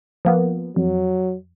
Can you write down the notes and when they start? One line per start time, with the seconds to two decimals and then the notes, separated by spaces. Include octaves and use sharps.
0.25 F3 A#3 B3
0.76 F2 F#3